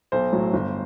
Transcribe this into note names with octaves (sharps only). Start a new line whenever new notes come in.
B1 C5
A2 F#3
G1